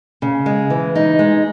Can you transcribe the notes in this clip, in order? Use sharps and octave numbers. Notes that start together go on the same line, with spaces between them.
C#3
G#3
E3
D#4
G#3